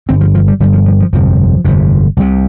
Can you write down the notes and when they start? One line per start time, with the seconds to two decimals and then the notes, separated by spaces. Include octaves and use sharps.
0.09 G1 G2 C4
0.21 F3
0.35 F3
0.48 G3
0.60 G1 G2 G3
0.73 F3
0.86 F3
1.00 F3
1.13 G1 F2 C3 F3
1.65 G1 F2 C3
2.17 C2 C3